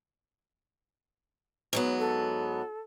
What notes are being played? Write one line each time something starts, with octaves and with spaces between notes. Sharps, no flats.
G#2 F#3 B3
A4